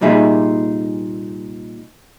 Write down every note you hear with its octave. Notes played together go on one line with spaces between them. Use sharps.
C2 A#2 G3 D#4 G#4 E5